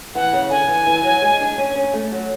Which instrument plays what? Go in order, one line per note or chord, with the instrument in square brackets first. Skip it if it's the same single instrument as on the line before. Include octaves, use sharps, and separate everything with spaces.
[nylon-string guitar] E3 [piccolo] F#5
[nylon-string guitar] C#3
[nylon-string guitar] D3 [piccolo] G#5
[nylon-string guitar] E3
E3
F#3
G#3
D4
C#4
C#4
A3
F#3